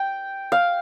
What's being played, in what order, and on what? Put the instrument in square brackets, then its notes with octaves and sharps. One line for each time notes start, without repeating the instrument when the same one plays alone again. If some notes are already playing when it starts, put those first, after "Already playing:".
Already playing: [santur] G5
F5